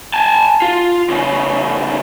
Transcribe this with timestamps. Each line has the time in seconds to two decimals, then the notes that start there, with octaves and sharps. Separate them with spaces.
0.14 G#5 A5
0.62 F4
1.10 A2 C#3